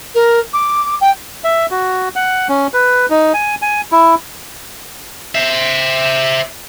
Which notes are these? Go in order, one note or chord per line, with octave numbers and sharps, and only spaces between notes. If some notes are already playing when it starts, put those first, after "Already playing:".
A#4
D6
G5
E5
F#4
F#5
C#4
B4
D#4
G#5
G#5
E4
C5 E5